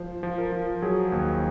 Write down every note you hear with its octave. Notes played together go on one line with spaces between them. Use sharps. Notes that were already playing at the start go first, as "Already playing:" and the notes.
Already playing: F3 C5
F3
A#4
F3
F#3 G#4
D#2